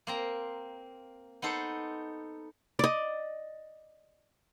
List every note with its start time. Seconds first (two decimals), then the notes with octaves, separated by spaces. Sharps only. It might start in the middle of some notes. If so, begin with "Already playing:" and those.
0.07 A#3 C4 A#5
1.42 B3 D#4 A4 C5
2.79 D5 D#5